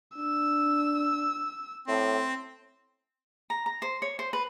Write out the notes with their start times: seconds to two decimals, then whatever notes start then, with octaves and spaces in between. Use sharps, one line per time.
0.16 D4 E6
1.88 A2 C4
3.50 A#5
3.66 A#5
3.82 C5
4.02 C#5
4.19 C5
4.33 B4